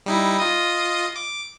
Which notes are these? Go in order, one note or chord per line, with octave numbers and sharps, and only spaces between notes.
G3 D#4 E4
F4 D#5 D#6
D6